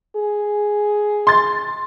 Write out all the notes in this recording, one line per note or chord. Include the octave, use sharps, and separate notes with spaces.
G#4
C6 A6